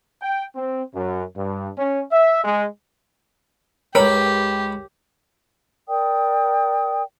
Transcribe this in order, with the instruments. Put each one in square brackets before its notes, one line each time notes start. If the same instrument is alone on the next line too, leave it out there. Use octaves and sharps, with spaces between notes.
[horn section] G5
C4
F#2
G2
C#4
E5
G#3
[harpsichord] C#2 B5 [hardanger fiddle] G4 [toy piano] A#4 C#5 [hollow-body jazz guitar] B4 G5 A#5
[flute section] A#4 D5 G5 D#6